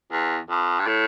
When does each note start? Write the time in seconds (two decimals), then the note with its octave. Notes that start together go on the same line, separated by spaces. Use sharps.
0.12 E2
0.50 F2
0.79 G2
0.87 A2